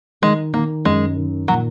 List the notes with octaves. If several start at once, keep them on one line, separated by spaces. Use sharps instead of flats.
D#3 G#3
D#3 A#3
F#2 G#3
D#3
A#2 F#3